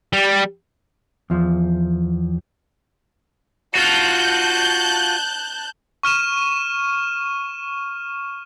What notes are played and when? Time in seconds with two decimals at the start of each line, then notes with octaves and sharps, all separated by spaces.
0.13 G3
1.30 E2 F3
3.75 F4 F#4 A5 F#6 G6
6.03 C#6 F6 D#7 E7